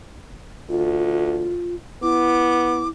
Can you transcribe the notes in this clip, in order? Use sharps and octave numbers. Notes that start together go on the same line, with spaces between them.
D2 F4
B3 E4 D6